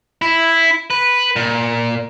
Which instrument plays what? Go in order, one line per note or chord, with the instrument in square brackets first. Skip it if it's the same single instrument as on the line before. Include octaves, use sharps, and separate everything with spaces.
[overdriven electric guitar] E4
B4
A#2